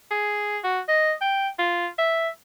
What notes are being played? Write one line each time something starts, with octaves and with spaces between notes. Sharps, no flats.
G#4
F#4
D#5
G5
F4
E5